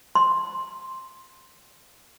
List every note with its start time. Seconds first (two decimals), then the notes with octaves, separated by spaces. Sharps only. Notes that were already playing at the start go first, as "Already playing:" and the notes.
0.15 C6